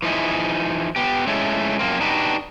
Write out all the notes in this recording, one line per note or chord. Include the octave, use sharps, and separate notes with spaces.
E3 F3 D#4 E4 G#4
B3 G4
G#3 A3 C#4 E4
F#2 F3 A#3 C4
D4 D#4 F#4 G4 B4